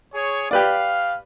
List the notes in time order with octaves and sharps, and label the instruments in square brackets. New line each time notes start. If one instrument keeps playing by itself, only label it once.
[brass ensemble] G#4 C#5
[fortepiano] G4 B4 D5 [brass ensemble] F5